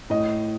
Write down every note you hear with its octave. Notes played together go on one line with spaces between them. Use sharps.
A2 D#5